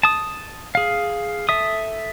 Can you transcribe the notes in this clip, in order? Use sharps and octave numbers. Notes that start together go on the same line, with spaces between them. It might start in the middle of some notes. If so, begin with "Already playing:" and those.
A5 D#6
G#4 F5
A4 E5 D#6